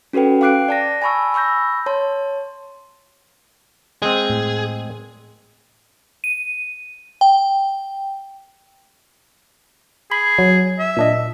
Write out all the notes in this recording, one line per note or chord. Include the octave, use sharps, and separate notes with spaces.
C#4 F#4 A4 B4 G5
F5 G5 D6 F#6 C7 D7
D5 A5 A#6
G#5 A5 B5 C#6 E6
B5 C#6 E6 G6 A#6
C#5 A5 C6
G#3 C4 G#4
A2
D#7
G5
G#4 B5
F#3
E5
A#2 D4 D#5